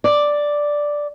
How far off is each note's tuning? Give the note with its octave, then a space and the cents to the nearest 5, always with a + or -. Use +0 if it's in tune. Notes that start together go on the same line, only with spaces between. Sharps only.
D5 +0